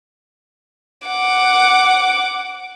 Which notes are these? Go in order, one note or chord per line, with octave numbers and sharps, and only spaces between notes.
F#5 D6